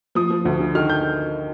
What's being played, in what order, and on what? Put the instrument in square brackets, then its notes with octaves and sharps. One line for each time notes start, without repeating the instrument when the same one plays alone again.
[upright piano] F3 D#6
F3
D2
D3
D#3 F6
G6